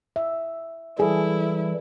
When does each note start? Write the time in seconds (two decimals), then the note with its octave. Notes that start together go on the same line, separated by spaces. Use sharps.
0.16 E5
0.99 E3 G3 E4 G#4 A4